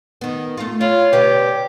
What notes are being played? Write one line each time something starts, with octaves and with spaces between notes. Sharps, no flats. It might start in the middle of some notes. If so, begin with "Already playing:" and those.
D#3 B3
A3 F4
E4 F4 C#5
B2 D3 G4 B4